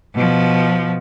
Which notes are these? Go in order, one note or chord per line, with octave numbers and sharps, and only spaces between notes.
B2 F3